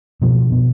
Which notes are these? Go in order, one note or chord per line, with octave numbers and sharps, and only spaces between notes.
B2 F3
B2